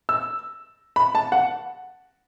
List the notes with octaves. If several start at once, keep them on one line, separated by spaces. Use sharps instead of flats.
E6
B5
A5
F#5